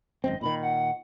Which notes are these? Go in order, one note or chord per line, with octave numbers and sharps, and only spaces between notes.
G#1 F#2 C4 D#5
A#2 D3 D#3 B5
F#5